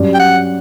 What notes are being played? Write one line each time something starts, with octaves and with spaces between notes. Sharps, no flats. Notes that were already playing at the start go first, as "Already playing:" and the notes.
Already playing: G2 F#3 C#4 G4 D5
G5
F#5